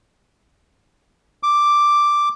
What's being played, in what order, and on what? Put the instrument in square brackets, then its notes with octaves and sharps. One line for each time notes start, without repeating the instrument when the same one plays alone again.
[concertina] D6